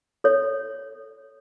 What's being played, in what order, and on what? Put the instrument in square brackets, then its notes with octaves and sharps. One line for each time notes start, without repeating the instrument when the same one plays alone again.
[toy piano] A4 C#5